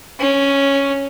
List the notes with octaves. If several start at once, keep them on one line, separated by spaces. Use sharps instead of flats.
C#4